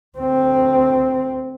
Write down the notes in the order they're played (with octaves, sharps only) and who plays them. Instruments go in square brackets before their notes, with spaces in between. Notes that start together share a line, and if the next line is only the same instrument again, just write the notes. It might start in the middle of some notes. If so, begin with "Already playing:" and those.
[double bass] D2 C4